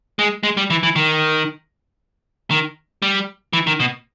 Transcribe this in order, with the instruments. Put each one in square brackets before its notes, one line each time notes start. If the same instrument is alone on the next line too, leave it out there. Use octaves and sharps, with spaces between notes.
[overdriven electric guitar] G#3
G#3
G3
E3
E3
D#3
D#3
G3
E3
D#3
B2